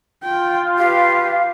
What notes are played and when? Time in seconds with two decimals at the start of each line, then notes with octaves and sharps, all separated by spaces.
0.23 F4 G5
0.78 G4 B4 F5